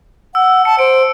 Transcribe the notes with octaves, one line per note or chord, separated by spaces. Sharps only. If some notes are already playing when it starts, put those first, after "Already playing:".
F#5 E6
A5 C#7
C5 D7